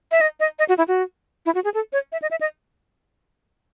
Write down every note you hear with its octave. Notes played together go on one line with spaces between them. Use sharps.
E5
D#5
D#5
D#5
F#4
E4
F#4
E4
F#4
G#4
A4
C#5
E5
D#5
E5
D#5